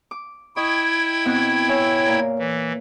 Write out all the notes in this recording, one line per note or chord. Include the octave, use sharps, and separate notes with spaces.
D6
E4 D#5 G5 C#6 G#6
B2 C4 F#6
C#5 E5 G#5
A#2 A#4
E3